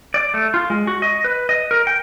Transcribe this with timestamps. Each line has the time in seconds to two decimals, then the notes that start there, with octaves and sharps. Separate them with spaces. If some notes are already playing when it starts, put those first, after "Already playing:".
0.14 D5
0.34 A3
0.54 F4
0.70 G#3
0.87 F#4
1.02 D#5
1.24 B4
1.49 D#5
1.71 A#4
1.87 G5